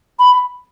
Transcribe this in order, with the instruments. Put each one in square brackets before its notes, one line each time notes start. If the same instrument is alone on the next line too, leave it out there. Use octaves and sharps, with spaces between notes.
[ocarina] B5